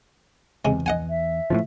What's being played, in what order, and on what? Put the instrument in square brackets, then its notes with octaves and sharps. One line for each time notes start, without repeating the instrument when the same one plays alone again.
[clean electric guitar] E2 [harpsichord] C3 G#3
[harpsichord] D#5 F#5 G#5
[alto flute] E5
[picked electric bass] A2 C3 F3